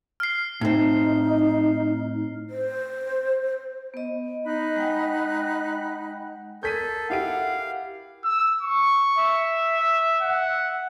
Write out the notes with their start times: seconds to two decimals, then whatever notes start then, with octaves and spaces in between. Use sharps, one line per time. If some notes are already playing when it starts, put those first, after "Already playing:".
0.20 F6 C7
0.61 A2 C4 D#4
2.50 C5
3.94 B3 D#5
4.46 D#4 B5 F#6
4.76 G#3 F#5 G5
6.63 A4 A#4 G6 G#6 B6 D#7
7.10 E4 G4 F5 F#5 D7
8.24 E6
8.61 C#6
9.18 E5
10.22 F#5